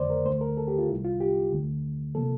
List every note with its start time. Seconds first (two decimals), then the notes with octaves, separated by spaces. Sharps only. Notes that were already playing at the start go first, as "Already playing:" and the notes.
Already playing: F2 D3 A3 C5 D5
0.10 A#4
0.26 D2 D3 A3 C5
0.41 A#4
0.57 A4
0.68 G4
0.79 F4
0.89 C2 C3 G3 E4
1.05 F4
1.20 G4
1.52 D2 D3 A3
2.15 C3 F3 A#3 A4